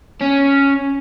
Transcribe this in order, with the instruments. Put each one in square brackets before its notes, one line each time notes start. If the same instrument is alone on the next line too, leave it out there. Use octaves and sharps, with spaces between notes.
[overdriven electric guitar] C#4